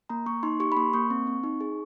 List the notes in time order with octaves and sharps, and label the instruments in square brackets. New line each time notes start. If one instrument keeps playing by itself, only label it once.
[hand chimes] A#3 A#5
A#3 C#6
D#4 C6
G4 C#6
B5
A#3 C6
A#3 C#6
C4
C4
D#4
G#4